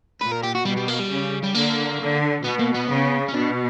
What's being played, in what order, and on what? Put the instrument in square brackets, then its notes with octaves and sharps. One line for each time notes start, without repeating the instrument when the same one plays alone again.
[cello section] A#2 [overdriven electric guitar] B4
[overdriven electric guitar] A#4
G4
F#4
[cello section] B2 [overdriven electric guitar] G3
[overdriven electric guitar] G3
A#3
G3
[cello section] C#3
[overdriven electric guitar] G3
[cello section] D3 [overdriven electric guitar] A#3
[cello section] D3
[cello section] B2 [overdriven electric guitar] B3
[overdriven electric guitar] A#3
B3
[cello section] C#3
[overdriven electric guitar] C#4
[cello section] B2 [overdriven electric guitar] D4